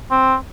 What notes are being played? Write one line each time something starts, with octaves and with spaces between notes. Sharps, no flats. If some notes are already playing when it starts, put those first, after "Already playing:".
C4